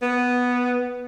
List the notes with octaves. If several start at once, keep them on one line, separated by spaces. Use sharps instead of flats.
B3